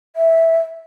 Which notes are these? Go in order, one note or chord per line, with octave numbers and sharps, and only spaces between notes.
E5